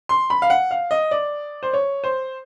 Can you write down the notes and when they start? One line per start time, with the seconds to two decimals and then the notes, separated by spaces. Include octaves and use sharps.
0.09 C6
0.30 B5
0.42 F5
0.50 F#5
0.71 F5
0.91 D#5
1.11 D5
1.63 C5
1.73 C#5
2.04 C5